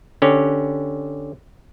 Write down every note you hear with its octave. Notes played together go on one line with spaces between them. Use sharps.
D3 C#4 G4